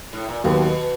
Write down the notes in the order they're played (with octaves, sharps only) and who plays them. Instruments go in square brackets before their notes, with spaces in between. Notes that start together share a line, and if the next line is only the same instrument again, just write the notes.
[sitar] A2
A#2
[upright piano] D#2 D#3 F#3 B3 [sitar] B2